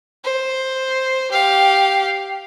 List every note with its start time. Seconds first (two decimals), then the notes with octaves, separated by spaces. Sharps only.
0.24 C5
1.31 G4 F5